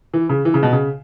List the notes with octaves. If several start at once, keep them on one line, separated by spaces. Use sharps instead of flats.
E3
C#3
E3
C#3
B2
C#3